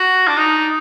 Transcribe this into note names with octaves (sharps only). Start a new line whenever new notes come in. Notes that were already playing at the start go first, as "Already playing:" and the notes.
Already playing: F#4
D4
D#4